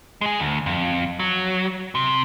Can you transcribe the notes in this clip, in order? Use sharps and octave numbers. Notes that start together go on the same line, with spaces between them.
G#3 G#4
D2
F2
F#3
C3